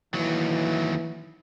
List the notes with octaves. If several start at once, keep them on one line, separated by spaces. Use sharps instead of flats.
D#2 E3 F#3